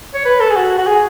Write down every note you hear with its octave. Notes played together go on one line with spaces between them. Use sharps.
C#5
B4
A4
G#4
F#4
F#4
G#4